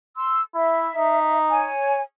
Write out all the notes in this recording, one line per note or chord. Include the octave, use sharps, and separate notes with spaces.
C6 E6
E4 E5
D#4
C#5 G#5